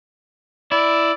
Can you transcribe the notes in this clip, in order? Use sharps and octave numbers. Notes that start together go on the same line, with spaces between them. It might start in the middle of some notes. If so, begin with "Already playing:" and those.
E4 D5